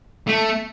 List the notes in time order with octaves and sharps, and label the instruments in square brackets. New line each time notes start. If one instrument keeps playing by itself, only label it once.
[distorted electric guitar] A3